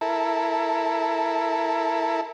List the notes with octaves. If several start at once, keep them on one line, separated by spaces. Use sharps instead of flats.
E4 A4 A#4